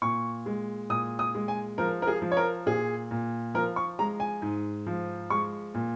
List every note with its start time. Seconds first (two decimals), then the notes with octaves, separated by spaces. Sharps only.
0.02 A#2 C#6
0.46 G#3
0.90 A#2 D#6
1.19 D#6
1.35 G#3
1.48 G#5
1.78 F3 A#4
2.02 A#4
2.07 G#4
2.22 F3
2.32 C#5
2.37 A#4
2.66 A#2 G#4
3.11 A#2
3.54 F3 A#4
3.76 C#6
3.99 G#3 A#5
4.20 G#5
4.42 G#2
4.87 F3
5.30 G#3 C#6
5.74 A#2